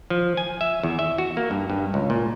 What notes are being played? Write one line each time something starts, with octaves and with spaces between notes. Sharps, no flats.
F3
G#5
E5
E2
E5
F#4
A#3
G2
G2
C#2
A#2